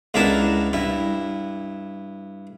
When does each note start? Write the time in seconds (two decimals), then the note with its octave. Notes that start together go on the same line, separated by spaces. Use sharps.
0.14 C#2 B3 D4 E4 A#4 A5
0.73 G2 E4